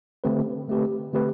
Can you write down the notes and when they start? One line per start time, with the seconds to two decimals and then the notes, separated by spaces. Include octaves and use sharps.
0.24 D3 A3 C4 G4 B4
0.68 D3 A3 C4 G4 B4
1.13 D3 A3 C4 G4 B4